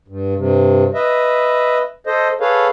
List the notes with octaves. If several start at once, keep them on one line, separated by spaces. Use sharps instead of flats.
G2
G2 C3
B4 D#5 E5
A4 C5 D#5
G#4 A4 B4 C#5 F5